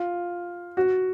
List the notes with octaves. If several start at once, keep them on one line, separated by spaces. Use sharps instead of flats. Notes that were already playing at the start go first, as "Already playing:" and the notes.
Already playing: F4
F#4